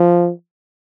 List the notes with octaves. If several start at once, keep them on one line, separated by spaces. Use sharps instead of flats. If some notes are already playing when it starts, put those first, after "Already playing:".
Already playing: F3